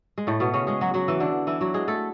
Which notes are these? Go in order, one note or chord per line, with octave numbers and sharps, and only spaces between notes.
G#3
A2 A3
B2 B3
C#3 C#4
G#3 G#4
F#3 F#4
F#3 F#4
E3 E4
D3 D4
E3 E4
F#3 F#4
G#3 G#4
A3 A4